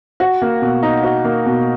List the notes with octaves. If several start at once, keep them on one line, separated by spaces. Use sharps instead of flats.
F#4
A#3
B2
D#4
F#4
A#3
B2